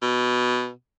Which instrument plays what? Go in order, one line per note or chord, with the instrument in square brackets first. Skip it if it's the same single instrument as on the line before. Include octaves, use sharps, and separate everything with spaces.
[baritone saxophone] B2